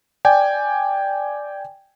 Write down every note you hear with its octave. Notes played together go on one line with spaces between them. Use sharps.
D5 G5 G#5